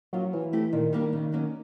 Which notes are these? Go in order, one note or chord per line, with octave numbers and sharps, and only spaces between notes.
F#3 A#3 C#4 F4
E3 F3
A3 C4 E4 G4
A#2 D#3
G3 A#3 D4
C#3
F#3 A#3 C#4